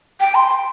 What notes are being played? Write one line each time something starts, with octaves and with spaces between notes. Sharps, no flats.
G5
C6